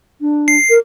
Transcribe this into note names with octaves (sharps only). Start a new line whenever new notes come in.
D4
C7
A#4